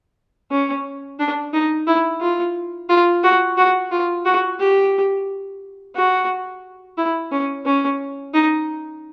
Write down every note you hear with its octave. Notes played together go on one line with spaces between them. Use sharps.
C#4
D4
D#4
E4
F4
F4
F#4
F#4
F4
F#4
G4
F#4
E4
C#4
C#4
D#4